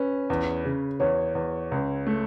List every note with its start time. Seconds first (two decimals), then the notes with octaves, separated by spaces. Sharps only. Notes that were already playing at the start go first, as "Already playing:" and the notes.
Already playing: C#4 B4
0.30 E2
0.65 C#3
1.00 E2 C#5
1.35 E2
1.71 C#2
2.07 A3